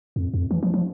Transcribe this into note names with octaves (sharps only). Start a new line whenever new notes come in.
F2
F2
E3
F3
F3